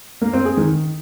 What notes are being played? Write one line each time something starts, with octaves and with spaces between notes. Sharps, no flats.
A#3
C4
G#4
D#3